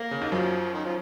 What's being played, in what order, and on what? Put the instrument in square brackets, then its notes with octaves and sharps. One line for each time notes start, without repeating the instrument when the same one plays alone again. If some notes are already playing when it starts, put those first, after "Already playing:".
Already playing: [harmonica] A#3
[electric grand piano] C#3
D#2 D#3
[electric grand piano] F#2 F#3 [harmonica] F3
[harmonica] D#3
F3